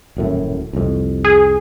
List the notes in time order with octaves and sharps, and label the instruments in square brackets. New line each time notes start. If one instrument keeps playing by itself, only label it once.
[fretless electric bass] D#1 F#2 A2
C2 F2
[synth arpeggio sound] G#4